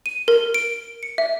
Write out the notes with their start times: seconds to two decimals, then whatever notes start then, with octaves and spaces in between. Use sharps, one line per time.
0.06 D#7
0.28 A#4
0.54 D7
1.03 C#7
1.18 E5